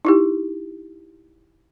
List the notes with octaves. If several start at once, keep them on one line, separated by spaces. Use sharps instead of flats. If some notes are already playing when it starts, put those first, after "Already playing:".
D#4 E4 G4